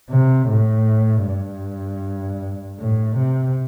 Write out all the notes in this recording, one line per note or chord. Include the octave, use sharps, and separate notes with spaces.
C3
A2
G2
A2
C3